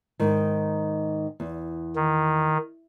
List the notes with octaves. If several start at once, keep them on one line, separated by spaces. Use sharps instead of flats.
G#2 D#3
E2
D#3